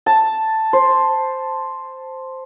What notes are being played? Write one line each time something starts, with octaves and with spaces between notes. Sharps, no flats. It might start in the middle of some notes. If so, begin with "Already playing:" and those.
A5
C5